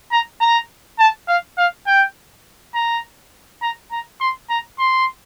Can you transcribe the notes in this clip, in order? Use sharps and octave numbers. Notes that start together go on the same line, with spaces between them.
A#5
A#5
A5
F5
F5
G5
A#5
A#5
A#5
C6
A#5
C6